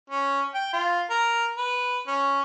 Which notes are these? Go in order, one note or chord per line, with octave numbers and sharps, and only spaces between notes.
C#4
G5
F4
A#4
B4
C#4